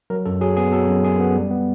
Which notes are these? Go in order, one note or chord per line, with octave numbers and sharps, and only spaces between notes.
F#3 A#4
F#2 A4
F#3 G#4
B3 G#4
F#3 A4
F#2
F#2 G#4
B3
G3
B3